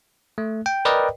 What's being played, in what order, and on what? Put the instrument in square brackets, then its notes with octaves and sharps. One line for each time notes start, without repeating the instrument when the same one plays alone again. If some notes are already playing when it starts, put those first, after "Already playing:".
[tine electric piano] A3
G5
A#4 B4 D5 D#5 G5